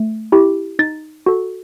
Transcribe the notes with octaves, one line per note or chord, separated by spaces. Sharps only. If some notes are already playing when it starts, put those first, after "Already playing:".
Already playing: A3
E4 G4
D#4 A6
F#4 A4